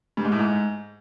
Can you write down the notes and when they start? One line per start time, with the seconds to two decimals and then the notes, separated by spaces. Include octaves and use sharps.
0.17 G2
0.24 G#2
0.32 A2
0.39 G#2